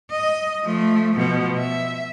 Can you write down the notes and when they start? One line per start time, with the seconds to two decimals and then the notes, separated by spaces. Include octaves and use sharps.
0.10 D#5
0.65 F3 A3
1.14 B2 F3
1.58 E5